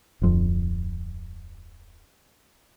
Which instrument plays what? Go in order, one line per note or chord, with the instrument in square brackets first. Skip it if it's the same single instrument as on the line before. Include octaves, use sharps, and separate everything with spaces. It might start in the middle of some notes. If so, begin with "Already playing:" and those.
[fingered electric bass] D1 F2